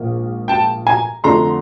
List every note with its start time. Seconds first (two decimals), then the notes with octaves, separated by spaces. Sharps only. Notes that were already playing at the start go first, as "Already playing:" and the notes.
Already playing: A#1 G#2 F3 A#3
0.48 G5 A5
0.87 G#5 A#5
1.24 F2 D3 F3 A3 C4 A#5 C6